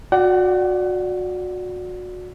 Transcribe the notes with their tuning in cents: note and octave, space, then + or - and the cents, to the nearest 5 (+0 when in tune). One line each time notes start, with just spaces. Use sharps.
F#4 -30 D5 +0 F#5 +40